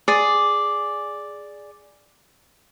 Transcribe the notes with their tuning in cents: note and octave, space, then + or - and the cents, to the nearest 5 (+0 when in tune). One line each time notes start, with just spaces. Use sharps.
G#4 +0 D5 +0